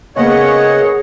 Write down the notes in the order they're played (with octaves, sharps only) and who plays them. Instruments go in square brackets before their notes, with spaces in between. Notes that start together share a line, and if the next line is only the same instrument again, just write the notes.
[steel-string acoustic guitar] C#3 A#3 B3 [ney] G#4 [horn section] C#5 [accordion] D#5 F#5